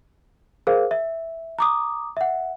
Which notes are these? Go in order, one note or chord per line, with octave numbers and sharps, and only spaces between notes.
G#4 A#4 C5 F5
E5
A#5 D6 D#6
E5 F#5